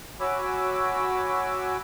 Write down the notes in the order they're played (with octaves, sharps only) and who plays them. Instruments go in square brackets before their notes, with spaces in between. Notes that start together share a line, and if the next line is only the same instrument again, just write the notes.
[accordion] F#4 C#5 G#5 B5 D6 E6